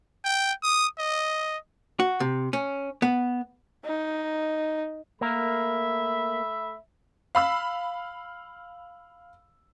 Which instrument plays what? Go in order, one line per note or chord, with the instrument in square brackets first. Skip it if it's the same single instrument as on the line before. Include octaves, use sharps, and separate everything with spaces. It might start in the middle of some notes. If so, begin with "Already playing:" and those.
[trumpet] G5
D#6
D#5
[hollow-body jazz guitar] F#4
C3
C#4
B3
[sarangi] D#4
[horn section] A3 E5 B5 [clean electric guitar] A#3 A#4
[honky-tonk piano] F5 B5 E6